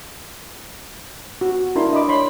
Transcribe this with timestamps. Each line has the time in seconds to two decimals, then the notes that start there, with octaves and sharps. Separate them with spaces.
1.41 F#4
1.76 D4 E4 A#4 B5 C6
1.93 D#5 B5 D6
2.08 C#5 B5 C6